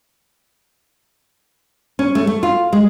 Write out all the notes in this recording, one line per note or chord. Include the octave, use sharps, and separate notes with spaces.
C#4
A3
A3
F4
G#3